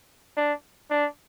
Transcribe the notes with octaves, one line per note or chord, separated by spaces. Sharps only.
D4
D4